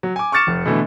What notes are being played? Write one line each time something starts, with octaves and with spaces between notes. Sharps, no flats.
F#3
G#5 D6
C#6 D6 F6 A6 C#7 E7
F1
B2 D3 E3 A3